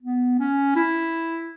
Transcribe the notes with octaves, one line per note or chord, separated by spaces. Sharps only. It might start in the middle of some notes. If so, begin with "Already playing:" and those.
B3
C#4
E4